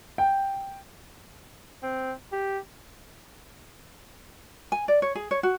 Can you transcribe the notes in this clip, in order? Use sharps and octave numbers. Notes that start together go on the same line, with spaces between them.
G5
C4
G4
G#5
D5
C#5
G#4
C#5
F#4